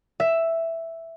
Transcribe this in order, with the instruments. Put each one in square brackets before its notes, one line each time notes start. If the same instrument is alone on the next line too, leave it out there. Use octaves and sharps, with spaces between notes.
[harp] E5